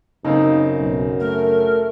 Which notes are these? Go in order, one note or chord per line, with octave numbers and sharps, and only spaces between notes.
F#2 C#3 A#3 C4 D#4
B1
A3 A#4